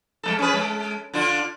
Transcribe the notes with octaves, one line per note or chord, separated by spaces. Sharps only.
G#3 A3 A4
C#4 G#4 B4
G#3
D3 D4 F4